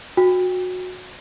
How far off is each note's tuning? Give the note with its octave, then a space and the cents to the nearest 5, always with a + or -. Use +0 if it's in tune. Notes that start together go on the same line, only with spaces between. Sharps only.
F#4 -20 G5 +25